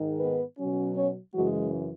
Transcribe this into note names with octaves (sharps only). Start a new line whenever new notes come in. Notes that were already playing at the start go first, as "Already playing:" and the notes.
Already playing: G#2 D#3 G#3
B3 B4
B2 F#3 C#4
C#4 C#5
F#2 C#3 E3 F#3 G#3 F#4